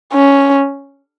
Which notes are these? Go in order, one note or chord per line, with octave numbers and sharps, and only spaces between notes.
C#4